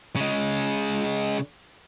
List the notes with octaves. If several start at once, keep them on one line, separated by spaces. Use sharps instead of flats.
C#3 G#3